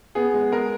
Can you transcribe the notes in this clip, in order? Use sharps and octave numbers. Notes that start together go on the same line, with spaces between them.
B3 G#4
G#3
G#3 A#4